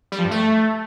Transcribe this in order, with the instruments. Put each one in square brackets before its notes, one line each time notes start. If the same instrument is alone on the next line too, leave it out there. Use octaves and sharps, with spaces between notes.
[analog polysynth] G3
F3
G2
A3